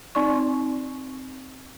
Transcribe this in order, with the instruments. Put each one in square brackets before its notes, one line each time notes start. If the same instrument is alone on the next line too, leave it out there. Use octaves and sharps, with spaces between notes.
[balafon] C4 D#4 D5 C#6